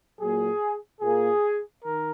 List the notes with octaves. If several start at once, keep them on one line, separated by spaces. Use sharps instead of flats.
A#2 F#3 A#3 G#4
A#2 A#3 G#4
D#3 A#4